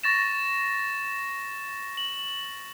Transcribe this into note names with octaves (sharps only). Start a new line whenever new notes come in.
C#6 A6 A#6 E7
F#7